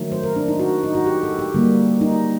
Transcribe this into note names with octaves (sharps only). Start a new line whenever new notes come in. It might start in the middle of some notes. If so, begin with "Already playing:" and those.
Already playing: D#3 F#3 A3
C5
A#4
D4
D#4
F#4
D#4
F#4
G4
A4
G4
D3 G3 A#3
D#4